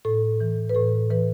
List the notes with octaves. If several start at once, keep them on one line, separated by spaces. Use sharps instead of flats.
A2 A4
E3
B4
A2 A4
E3 B4